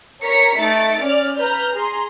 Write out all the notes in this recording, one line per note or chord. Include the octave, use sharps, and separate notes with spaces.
A#4 C#5 A#5 B6 C#7
A3 D#4 A6 C#7 D7
C#4 D5 D6 F6
B4 A#5 F6 G6
G#4 A#5 C6